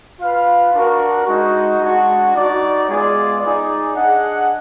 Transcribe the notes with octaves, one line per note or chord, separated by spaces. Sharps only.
F4 B4 F5
D4 F#4 A#4
G#3 D#4 F#4
G#3 D4 F#4
D#4 F#4 D5
G#3 B3 F4 G#4 D5
D#4 G#4 D5
D4 G#4 D#5 F#5